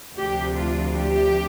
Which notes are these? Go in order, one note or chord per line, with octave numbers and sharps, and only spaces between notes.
D2 C3 F3 D4 G4
F4
G4